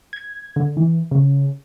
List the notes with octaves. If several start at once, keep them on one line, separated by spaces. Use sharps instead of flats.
G#6
D3
E3
C#3